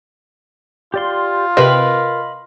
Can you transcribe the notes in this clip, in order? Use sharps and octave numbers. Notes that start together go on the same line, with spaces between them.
F4 G4 D5 C6
C3 C4 A#4 B4 D#5 B5